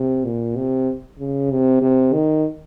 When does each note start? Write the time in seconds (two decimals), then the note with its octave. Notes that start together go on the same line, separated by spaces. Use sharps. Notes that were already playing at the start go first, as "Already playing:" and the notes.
Already playing: C3
0.25 A#2
0.56 C3
1.19 C#3
1.51 C3
1.82 C3
2.13 D#3